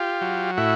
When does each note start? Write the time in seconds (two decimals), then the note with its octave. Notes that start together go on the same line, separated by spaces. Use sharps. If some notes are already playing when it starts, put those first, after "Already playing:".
Already playing: F4 G4
0.21 F#3
0.57 A2 E4 F#4